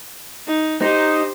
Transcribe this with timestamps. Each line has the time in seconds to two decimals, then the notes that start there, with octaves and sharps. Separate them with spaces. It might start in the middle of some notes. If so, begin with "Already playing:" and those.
0.48 D#4
0.82 D#4 G4 C5